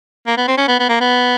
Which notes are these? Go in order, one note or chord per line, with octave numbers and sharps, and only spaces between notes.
A#3
B3
C4
C#4
B3
B3
A#3
B3